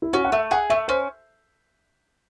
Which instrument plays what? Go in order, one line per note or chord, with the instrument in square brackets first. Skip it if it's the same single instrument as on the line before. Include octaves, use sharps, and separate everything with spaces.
[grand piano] E4
[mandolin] C#4 [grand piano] F#4
[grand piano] F#5
[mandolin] A3 [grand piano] E5
[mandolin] G#4 [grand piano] F#5
[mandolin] A3 [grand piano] E5
[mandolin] C#4 [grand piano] C5